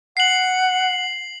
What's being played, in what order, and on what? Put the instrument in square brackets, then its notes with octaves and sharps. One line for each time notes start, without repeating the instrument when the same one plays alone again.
[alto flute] F#5 [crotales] C7 F#7